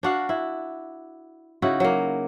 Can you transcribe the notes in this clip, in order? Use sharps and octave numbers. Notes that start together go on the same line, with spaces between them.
D4 F#4 F5
E4
C#3 D#4 E4 F#4
F#3 A#3